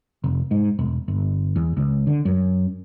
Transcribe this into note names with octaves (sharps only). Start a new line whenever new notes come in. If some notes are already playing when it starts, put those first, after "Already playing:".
F1
G#2
E1
G1
E2
C#2
D3
F#2